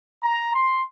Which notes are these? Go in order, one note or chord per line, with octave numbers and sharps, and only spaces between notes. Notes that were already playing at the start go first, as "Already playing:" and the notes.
A#5
C6